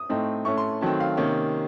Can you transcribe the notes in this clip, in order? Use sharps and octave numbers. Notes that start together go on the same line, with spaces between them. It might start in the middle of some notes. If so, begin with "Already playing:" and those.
Already playing: D#6
A2 A3 C4 D#4
A2 A3 C#4 C#6
C6
D#3 F#3 A3 C4 A5
F5
C3 D#3 A#3 C#4